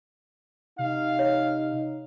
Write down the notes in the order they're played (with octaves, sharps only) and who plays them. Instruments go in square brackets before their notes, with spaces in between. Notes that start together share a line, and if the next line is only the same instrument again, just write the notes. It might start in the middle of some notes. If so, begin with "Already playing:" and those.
[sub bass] C3 [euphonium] D#4 [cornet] F5
[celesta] C#5